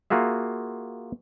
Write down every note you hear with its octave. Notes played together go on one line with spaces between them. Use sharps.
A#3 F4 F#4 G#4 E5